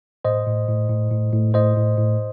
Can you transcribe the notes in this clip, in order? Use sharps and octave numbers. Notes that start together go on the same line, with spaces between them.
A2 C5 D#5
A2
A2
A2
A2
A2
A2 C5 D#5
A2
A2